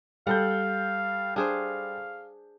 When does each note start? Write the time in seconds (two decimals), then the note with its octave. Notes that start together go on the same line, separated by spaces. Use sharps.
0.27 G3 A4 F5 F#5 G6
1.36 D4 G#4 C5 F5